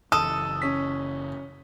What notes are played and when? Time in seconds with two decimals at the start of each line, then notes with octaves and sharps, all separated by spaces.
0.12 F#1 C#3 E3 A4 D#6
0.62 C#4 B6